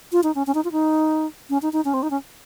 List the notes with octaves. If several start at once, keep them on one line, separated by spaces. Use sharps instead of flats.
F4
D#4
C#4
C#4
D#4
F4
D#4
C#4
D#4
D#4
C#4
C4
D#4
C#4